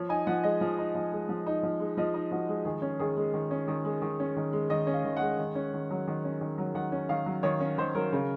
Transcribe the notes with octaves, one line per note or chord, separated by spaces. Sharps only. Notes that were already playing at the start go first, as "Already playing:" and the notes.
Already playing: F3 C#5
D#4 G#5
F3 F#5
G#3 D#5
F3
D#4
F3
G#3
F3
D#4
F3
G#3
F3 D#5
D#4
F3 F#4
G#3
D#3 G#4
C#4
D#3 G#4
G#3
D#3
C#4
D#3
G#3
D#3
C#4
D#3
G#3
D#3 D#5
C#4
F5
D#3
G#3 F#5
D#3
C#4
D#3
F#3
D#3
C#4
D#3
F#3
D#3 F#5
C#4
D#3 F5
F#3
D#3 C#5
C#4
D#3 C5
F#3 A#4
C#3